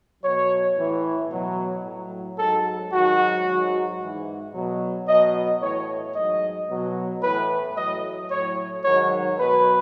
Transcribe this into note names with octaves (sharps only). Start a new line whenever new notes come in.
B2 F#3 C#5
A2 E3
B2 F#3
A2 F#3
G#2 F#3 A4
G#2 D#3 F#3 F#4
G#2 F#3
G#2 E3
B2 F#3
B2 F#3 D#5
A2 E3 C#5
G#2 F#3 D#5
B2 F#3
A2 E3 B4
A2 F#3 D#5
A2 F#3 C#5
G#2 D#3 F#3 C#5
B2 F#3 B4